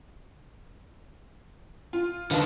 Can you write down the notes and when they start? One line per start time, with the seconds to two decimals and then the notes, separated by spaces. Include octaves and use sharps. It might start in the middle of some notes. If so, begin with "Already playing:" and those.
1.93 F4
2.31 D3 D#3 B4 F5 A5